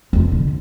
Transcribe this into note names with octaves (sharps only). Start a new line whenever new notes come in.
F2
D3